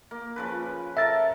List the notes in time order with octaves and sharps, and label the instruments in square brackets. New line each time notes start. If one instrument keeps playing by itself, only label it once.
[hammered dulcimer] A#3
C#3 F3 B4
[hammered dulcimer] A4 A#4 [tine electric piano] E5 A6